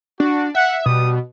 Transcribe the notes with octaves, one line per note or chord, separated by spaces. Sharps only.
D4 F#4
E5 F#5
B2 G3 D#6